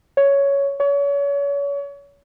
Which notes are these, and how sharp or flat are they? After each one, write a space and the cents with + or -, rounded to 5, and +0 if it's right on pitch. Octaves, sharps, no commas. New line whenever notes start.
C#5 +10
C#5 +35